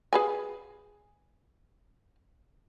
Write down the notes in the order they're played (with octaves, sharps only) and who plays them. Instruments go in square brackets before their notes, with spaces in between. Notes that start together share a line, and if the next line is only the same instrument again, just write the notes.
[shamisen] G#4 B4 G#5